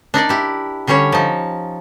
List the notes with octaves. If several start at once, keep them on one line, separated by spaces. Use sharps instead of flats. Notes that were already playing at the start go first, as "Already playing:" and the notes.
D4 D#4 A#4 D5
E4 G4
D3 G3 C#4 G4 C#5
F3 D#4